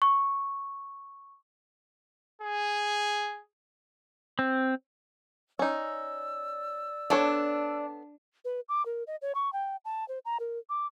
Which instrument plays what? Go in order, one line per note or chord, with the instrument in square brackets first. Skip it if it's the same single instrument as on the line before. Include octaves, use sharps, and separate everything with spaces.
[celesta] C#6
[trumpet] G#4
[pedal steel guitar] C4
[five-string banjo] C#4 D#4 [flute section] D5 E6
[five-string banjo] B3 A4 C#5 [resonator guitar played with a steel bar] D4
[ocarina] B4
D6
A#4
D#5
C#5
C#6
G5
A5
C5
A#5
A#4
D6